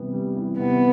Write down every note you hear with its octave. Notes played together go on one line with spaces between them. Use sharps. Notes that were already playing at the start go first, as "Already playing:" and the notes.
Already playing: C3 E3 G3 B3
G3
E3
C3 B3